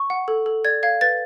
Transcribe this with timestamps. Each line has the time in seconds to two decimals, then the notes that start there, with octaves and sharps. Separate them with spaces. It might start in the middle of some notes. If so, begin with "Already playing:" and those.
Already playing: C#6
0.10 F#5
0.28 A4
0.46 A4
0.65 D5 G#6
0.83 F5 G#6
1.01 B4 A6